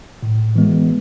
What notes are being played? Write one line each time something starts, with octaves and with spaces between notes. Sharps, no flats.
A2
E3 G#3 B3